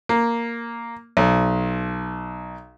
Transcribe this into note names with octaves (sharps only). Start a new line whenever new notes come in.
A#3
B1